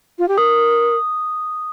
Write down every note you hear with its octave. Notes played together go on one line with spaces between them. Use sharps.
F4
G4
A#4 D#6